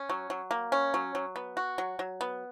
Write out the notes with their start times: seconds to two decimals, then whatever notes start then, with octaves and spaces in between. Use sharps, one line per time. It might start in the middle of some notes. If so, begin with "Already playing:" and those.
Already playing: C#4
0.10 F#3
0.30 F#3
0.51 A#3
0.72 C#4
0.94 F#3
1.15 F#3
1.36 B3
1.57 F#4
1.78 F#3
1.99 F#3
2.21 B3